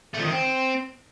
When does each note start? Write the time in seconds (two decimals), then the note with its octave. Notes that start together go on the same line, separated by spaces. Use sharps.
0.14 A3
0.19 F3
0.25 D#3
0.30 C4